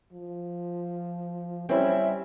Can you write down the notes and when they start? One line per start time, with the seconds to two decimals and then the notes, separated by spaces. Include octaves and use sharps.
0.13 F3
1.69 G3 C4 C#4 E4 E5